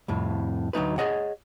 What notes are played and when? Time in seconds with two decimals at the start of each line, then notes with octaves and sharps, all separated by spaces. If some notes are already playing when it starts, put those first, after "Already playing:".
0.08 C2 F2 A2
0.73 D2 F#3 D#4 B4
0.98 G#4 C#5 D#5 F#5